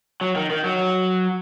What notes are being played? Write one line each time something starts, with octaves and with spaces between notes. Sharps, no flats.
F#3
D#3
D#3
F#3